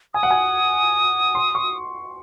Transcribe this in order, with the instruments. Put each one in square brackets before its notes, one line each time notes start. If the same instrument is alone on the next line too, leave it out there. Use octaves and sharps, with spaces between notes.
[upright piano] G#5 [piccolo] D#6
[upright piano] F#5
G#5
C6
C#6